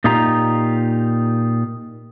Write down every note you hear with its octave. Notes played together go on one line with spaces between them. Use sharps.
A#2 D#4 F4 G4 A#5